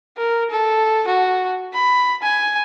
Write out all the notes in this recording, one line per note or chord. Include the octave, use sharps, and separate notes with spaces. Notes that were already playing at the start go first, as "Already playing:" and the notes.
A#4
A4
F#4
B5
G#5